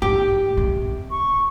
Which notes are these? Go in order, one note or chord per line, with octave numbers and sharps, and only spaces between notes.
G#2 G4
C3
C#6